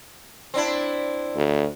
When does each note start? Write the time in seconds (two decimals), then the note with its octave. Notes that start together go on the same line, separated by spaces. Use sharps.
0.54 C4 D4 E4
1.35 D2